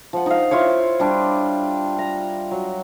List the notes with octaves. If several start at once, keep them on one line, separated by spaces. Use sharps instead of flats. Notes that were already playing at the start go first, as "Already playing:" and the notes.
F3 F#5
D#4 F5
E4 F4 C5 C#5
G3 D4
A#5
F#3